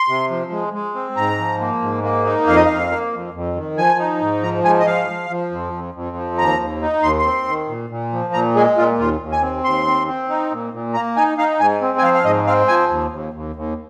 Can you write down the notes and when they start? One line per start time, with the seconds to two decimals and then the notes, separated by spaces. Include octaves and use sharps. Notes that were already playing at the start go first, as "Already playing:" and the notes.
Already playing: C6
0.08 C3
0.30 F3
0.52 G#3
0.73 G#3
0.95 C4
1.16 G#2 A#5
1.39 F3
1.60 A#3
1.82 G#2
2.03 A#3
2.25 D#4
2.47 F2 F5
2.56 D#5
2.65 F2 F5
2.90 A#3
3.13 F2
3.34 F2
3.56 D#3
3.77 F3 G#5
3.99 D#4
4.21 G#2
4.42 F3 A#5
4.64 G#2 G#5
4.80 D#5
4.86 F3 F5
5.08 F3
5.30 F3
5.51 F2
5.73 F2
5.94 F2
6.16 F3
6.38 D#2 A#5
6.60 D#2
6.82 D#4
7.03 D#2 C6
7.19 C6
7.25 C4
7.47 D#3
7.68 A#2
7.90 A#2
8.12 F3
8.33 A#2 A#5
8.56 G#3 G#4
8.77 A#2 F4
8.99 D#2 F4
9.21 D#2
9.32 G#5
9.42 C4
9.64 D#2 C6
9.87 C4
10.08 C4
10.30 D#4
10.51 A#2
10.73 A#2
10.94 A#3 A#5
11.17 D#4 G#5
11.38 D#4 F5
11.60 G#2 G#5
11.82 C4
11.98 G#5
12.03 F3 F5
12.14 F5
12.24 G#2 D#5
12.47 C4 F5
12.68 F3 G#5
12.90 D#2
13.12 D#2
13.33 D#2
13.56 D#2